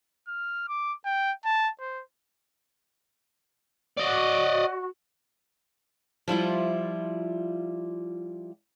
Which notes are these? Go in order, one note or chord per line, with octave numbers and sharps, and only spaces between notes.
F6
D6
G5
A5
C5
F#4 D5 D#5
F3 G3 E4 F4